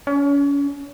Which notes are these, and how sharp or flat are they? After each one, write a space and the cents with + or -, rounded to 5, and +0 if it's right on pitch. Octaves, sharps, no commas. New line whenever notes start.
C#4 +35